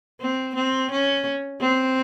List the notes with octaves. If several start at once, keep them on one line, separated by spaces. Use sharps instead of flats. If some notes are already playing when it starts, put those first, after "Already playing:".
C4
C4
C#4
C4